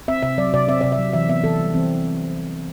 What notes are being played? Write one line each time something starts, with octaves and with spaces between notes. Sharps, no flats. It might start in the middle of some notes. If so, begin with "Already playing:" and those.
C4 E5
C3 E5
F#3 D5
C3 D5
C4 E5
C3 D5
E5
F#3
E3 E5
B3 E5
E3 A4
G3
E3 C4